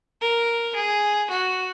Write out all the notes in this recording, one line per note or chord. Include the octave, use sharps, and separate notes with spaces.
A#4
G#4
F#4